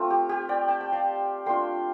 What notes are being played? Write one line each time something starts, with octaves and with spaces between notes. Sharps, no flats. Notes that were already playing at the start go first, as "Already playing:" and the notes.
Already playing: A3 C4 F4
G4
G4
D5 G5
A5
G5
F5 A5
A3 D4 F4 G5 C6